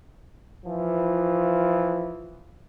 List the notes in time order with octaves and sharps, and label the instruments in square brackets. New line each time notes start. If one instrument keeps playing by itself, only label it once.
[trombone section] E3 F3